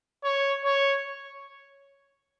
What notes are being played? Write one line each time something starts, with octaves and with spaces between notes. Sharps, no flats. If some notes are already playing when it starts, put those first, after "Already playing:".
C#5
C#5